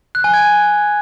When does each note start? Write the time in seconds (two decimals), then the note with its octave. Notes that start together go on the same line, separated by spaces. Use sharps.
0.15 F#6
0.24 G#5
0.34 G#6